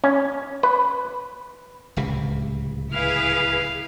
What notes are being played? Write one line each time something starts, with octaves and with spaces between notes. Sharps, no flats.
C#4
B4
D1 C#2 C3
E4 G#4 B4 F5